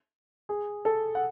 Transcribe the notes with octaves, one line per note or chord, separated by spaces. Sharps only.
G#4
A4
F#5